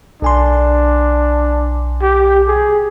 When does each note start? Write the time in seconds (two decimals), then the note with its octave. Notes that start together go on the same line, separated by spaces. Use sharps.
0.22 B1 D4 G#5 C6
2.02 G4
2.48 G#4